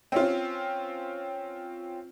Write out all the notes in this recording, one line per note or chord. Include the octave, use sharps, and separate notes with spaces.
C4 C#4 F4